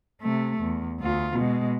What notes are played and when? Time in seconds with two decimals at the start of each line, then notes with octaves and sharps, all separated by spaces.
0.22 C3 A3
0.62 E2
1.00 D2 F4
1.36 B2 G#3